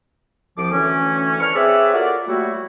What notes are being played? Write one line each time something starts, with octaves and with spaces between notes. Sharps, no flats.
C2 F3 D6
D2 A2 E3 C#4
A4 B4 D5 C#6 F6
C4 G#4 B4 C#5 D5 E5
F4 F#4 A4 A#4 D5
F#3 G3 A3 A#3 E4 F#4